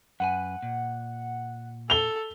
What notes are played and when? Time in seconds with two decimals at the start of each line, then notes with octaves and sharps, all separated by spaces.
0.20 F#2 B4 F#5 G#5
0.62 A#2
1.90 A4 F7 G7